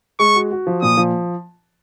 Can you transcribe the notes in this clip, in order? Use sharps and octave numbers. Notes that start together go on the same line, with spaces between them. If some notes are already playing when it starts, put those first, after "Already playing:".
G#3 C#6
F#4
F#4
F3
A#2 D#6
F3